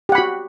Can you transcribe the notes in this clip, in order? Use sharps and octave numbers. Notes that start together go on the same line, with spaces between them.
F#4 G4 F#5 B5